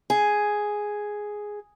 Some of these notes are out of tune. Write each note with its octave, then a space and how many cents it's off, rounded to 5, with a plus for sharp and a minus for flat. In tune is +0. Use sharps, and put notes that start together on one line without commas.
G#4 +0